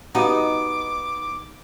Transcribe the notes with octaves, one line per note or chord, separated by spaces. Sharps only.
B3 D#4 F#4 G4 F5 D6